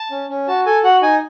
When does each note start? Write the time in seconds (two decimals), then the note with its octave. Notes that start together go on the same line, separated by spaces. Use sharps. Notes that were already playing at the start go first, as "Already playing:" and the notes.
Already playing: A5
0.11 C#4
0.29 C#4
0.48 F#4 A5
0.66 A4 G#5
0.84 F#4 F#5
1.02 D#4 G#5